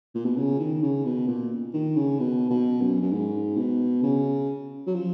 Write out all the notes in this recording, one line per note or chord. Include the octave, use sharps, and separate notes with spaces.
A#2
B2
C#3
D#3
C#3
B2
A#2
D#3
C#3
B2
B2
F#2
F#2
G#2
B2
C#3
F#3
F3